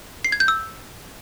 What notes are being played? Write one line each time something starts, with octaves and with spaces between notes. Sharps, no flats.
C7
G#6
G6
E6